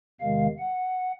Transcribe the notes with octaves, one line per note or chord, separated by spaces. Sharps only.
E2 C3 D#3 G#3 F5
F#5